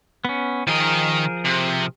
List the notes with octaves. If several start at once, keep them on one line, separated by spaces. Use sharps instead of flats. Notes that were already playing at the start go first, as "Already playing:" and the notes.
B3 C#4
D#3 F3 G#4 A#4 D#5
C3